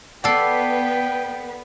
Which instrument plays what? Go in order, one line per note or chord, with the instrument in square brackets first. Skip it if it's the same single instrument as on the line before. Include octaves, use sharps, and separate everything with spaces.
[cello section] B3 B4 [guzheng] A4 D5 [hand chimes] F#5 C7 [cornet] G5